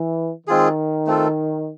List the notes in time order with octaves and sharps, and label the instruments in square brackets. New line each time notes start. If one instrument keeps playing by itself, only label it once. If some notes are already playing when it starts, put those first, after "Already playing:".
Already playing: [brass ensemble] E3
[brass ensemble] D#3 [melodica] G#3 C4 F4 G#4
[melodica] A3 C4 F4 A4